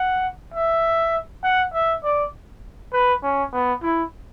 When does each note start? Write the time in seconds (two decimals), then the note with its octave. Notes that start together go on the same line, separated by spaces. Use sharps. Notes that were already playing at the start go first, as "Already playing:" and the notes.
Already playing: F#5
0.54 E5
1.43 F#5
1.73 E5
2.04 D5
2.93 B4
3.23 C#4
3.52 B3
3.82 E4